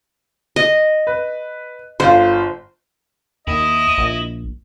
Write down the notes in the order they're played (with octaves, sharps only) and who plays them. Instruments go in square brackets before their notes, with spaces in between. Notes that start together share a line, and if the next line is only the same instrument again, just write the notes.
[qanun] D#5
[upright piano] B4
[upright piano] G1 F4 [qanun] C5
[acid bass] D#2 [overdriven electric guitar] E4 [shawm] D#5
[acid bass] A#1